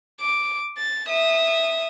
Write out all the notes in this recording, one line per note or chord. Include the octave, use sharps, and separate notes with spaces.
D6
A6
E5 D#6